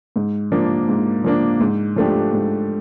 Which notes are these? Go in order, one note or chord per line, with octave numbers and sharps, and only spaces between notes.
G#2
F3 A#3 D4
G#2
F3 A#3 D4
G#2
F3 A3 D4 G4
G#2